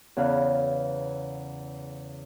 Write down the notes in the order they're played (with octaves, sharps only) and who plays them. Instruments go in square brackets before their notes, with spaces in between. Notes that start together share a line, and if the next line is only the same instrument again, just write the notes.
[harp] E2 C#3 B4 F5